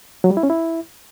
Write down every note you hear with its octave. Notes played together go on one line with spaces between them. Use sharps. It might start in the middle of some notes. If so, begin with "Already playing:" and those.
F#3
G3
E4
C#4
E4